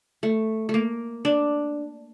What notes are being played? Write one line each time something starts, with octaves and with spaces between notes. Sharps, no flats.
A3
A3
A#3
D4